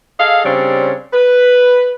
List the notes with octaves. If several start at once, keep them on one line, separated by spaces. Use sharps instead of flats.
G#4 A4 D#5 F5
C#3 G3 C4 D4 C#5
B4